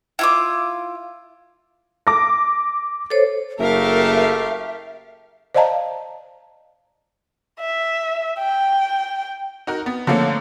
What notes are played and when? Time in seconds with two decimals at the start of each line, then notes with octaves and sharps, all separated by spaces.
0.19 E4 F4 D6
2.07 D6 A#6
3.10 A4 C5 C#5
3.59 F#1 A3 G4 A4 A#4 E5 F5
5.54 C5 D5 D#5 F5 A5 A#5
7.60 E5
8.39 G5
9.67 D#4 F#4 A#4
9.86 B3
10.07 D3 F3 A3 A#3 C#4